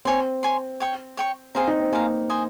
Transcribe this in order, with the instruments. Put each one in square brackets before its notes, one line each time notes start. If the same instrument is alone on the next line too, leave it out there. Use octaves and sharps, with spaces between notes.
[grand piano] C4 [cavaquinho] C#5 G#5 C6
[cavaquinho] C#5 G#5 C6
C#5 G5 C#6
C#5 G5 C#6
[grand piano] C4 [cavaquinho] G#4 C5 F5 A#5
[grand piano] D#4
C4
[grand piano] A#3 [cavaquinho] G#4 C5 F5 A#5
[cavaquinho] C5 D#5 G#5